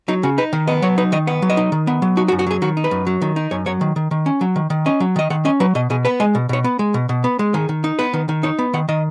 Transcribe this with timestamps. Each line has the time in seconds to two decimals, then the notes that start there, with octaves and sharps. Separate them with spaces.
0.08 F#3 D#4
0.23 C#3 F#4
0.38 D#4 B4
0.53 D#3
0.67 B3 D#5
0.82 F#3 C#5
0.98 D#4 B4
1.12 D#3 D#5
1.27 B3 F#5
1.42 F#3
1.50 D#5
1.57 D#4
1.72 D#3
1.87 B3
2.02 F#3
2.17 D#4 F#4
2.28 F#4
2.32 F#2
2.39 F#4
2.47 F#3 G#4
2.62 D#3 F#4
2.77 D#4
2.84 B4
2.91 F#2
3.07 F#3
3.22 D#3
3.36 D#4
3.51 F#2 C#5
3.66 F#3 C#5
3.81 D#3
3.96 D#3
4.11 D#3
4.26 C#4
4.41 F#3
4.56 D#3
4.70 D#3
4.86 C#4 D#5
5.00 F#3
5.16 D#3 D#5
5.30 D#3 F#5
5.45 C#4 D#5
5.60 F#3 B4
5.75 B2 D#5
5.90 B2 G#4
6.05 B3 B4
6.20 G#3 D#5
6.35 B2
6.49 B2 C#5
6.64 B3
6.79 G#3
6.94 B2
7.09 B2
7.24 B3
7.39 G#3
7.54 D#3 G#4
7.69 D#3
7.84 D#4
7.99 B3 B4
8.13 D#3
8.29 D#3
8.43 D#4 C#5
8.59 B3
8.74 D#3 F#5
8.88 D#3 D#5